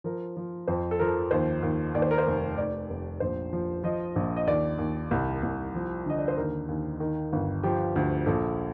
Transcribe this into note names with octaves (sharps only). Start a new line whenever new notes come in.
F3 A#4
F3
F2 C5
A4
F3 A#4
D#2 C5
D#2
D#2 D5
C5
A#4
C5
F1
F1 D5
F1
A#1 C5
F3
F3 D#5
A#1
D#5
D#2 D5
D#2
C2
C2
F3
D3 D#5
D5
C5
D#2 A#4
D#2
D#3
G1
F3 G4
D2
A#1 A4